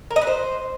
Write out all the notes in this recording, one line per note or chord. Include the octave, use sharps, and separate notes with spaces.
A#4
D#5
B4
C5